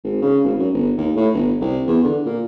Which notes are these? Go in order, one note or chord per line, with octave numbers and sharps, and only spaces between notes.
G#1
C#3
G#1
F#2
G1
D#2
A2
G1
C2
E2
D3
A#2